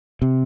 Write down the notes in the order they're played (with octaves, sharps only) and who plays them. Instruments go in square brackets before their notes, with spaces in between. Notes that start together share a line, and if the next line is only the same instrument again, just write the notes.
[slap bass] C3